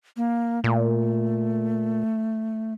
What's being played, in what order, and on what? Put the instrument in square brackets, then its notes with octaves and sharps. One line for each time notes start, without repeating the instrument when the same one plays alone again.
[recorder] A#3
[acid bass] A#2 [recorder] A3